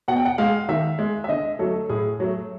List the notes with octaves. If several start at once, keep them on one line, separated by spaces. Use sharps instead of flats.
B2 F#5
G5
F#5
G#3 F5
D#3 E5
G#3
E5
D3 D#5
F#3 A3 A4
A2 G#4
F#3 A3